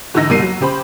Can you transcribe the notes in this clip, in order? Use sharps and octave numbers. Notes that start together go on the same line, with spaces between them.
G#2 D3 E3 D#4 E6 A#6
F#1 B2 G3 A#4 C7 D#7
F#3
C#3 G4 C5 B5